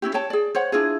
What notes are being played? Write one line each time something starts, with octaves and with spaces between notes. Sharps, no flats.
C#4 D4 E4 G4
C#5 G5 A5
G#4 D5
C5 C#5 F#5
D4 E4 F4 G#4